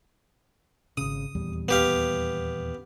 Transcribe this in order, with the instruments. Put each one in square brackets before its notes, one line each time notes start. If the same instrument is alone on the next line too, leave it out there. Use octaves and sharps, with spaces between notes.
[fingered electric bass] G#1 C#3 [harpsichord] D#6
[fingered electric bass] D#1 E2 G3
[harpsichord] B3 G4 F5